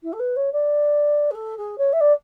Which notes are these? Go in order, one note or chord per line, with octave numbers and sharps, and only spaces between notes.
E4
A4
B4
C#5
D5
G#4
A4
G#4
C#5
E5
D5